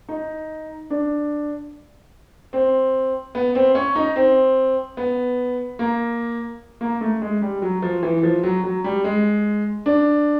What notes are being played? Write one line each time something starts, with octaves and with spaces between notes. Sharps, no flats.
D#4
D4
C4
B3
C4
C#4
D#4
C4
B3
A#3
A#3
A3
G#3
G3
F#3
F3
E3
F3
F#3
F#3
G3
G#3
D4